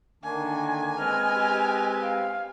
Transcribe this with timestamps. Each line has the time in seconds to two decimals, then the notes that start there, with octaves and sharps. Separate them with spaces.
0.23 D3 D#3 A#3 D4 G#5
0.99 G#3 C4 B4 D#5 F6
1.35 G4
2.03 F5